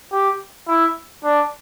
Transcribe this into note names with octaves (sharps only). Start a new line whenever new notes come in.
G4
E4
D4